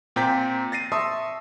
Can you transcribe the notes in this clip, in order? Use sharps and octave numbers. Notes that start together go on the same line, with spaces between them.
A#2 C4 G5 A#5 G6 B6
A6 A#6 C7 D#7
E5 A5 C6 C#6 D#6 E6